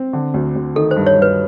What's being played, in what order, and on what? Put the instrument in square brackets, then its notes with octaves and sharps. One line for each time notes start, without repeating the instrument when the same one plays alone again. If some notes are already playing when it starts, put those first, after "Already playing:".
Already playing: [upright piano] C4
D3
D2
D2
[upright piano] D#3 [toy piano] A4
[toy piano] C5
[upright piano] G2
[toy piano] C#5
[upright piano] G2
[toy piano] B4